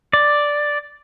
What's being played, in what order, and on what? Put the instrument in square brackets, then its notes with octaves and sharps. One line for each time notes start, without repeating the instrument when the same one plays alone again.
[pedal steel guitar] D5